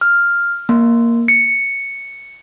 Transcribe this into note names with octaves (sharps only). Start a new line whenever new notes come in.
F6
A#3
C#7